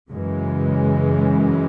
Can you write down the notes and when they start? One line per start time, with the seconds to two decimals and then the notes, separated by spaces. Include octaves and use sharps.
0.10 F#2 C#3 E3 G#3